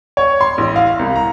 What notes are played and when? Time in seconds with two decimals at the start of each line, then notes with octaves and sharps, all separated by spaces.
0.17 C#5
0.41 C6
0.58 A1
0.76 F5
0.99 C2
1.16 A#5